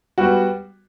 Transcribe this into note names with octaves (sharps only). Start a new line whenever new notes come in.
G3 B3 F#4